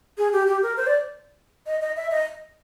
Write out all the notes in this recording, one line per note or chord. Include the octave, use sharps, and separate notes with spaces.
G#4
G4
G4
A#4
C5
D5
D#5
D#5
E5
D#5